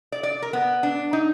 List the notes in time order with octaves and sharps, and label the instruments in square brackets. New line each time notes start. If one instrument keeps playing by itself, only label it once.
[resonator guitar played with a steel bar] D5
D5
A#4
B3
D4
D#4